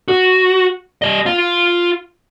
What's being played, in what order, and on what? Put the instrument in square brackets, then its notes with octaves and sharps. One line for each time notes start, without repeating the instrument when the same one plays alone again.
[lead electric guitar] F#4
G3 D#5
F4 F5